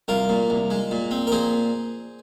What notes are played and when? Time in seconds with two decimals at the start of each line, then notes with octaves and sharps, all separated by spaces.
0.08 C2 F4 A#4
0.29 A#2
0.50 C2
0.70 G#3
0.91 A#2
1.11 C4
1.27 A#4
1.32 A#2 G#4 C5